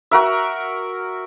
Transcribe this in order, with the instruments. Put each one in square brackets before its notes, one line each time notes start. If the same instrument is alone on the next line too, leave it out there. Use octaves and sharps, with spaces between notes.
[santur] F#4 A#4 E5